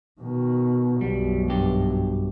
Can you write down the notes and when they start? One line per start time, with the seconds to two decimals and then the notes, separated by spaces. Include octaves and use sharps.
0.21 B2 D#3
1.01 B1 F#2 G3
1.49 G2 G4